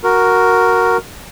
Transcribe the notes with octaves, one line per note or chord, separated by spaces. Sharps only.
F#4 A#4